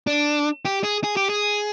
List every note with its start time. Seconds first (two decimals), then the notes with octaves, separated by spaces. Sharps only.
0.07 D4
0.65 G4
0.84 G#4
1.04 G#4
1.17 G4
1.30 G#4